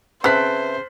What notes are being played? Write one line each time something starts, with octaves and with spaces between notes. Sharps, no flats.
C#3 C4 B4 C5 E5 A5 F#6 B6